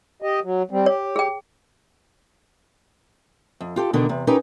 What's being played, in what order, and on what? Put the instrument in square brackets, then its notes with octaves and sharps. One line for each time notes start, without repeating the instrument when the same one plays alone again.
[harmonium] G4 D#5
F#3
G3 C4
[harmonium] G4 [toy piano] C#5
[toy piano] G#4 G5
[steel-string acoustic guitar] F2
F4 G4 A4
B2 D3 D#3 B3 D4 A#4
E2 C3
C#4 D#4 G4 A#4 B4